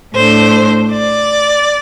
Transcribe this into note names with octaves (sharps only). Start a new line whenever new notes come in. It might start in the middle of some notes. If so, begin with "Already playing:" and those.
A2 A3 D4 C5
D5